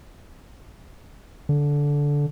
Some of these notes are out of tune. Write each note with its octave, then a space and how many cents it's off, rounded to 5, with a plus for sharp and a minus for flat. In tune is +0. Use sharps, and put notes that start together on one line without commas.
D3 -15